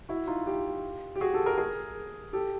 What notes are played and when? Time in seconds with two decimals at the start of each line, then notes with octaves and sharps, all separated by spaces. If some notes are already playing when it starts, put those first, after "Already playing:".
0.09 E4 F#4
0.27 D#4 F4
0.47 F4 G4
1.16 G4
1.21 F#4 G#4
1.34 G4 A4
1.46 G#4 A#4
1.58 G#4 A#4
2.33 G4 A4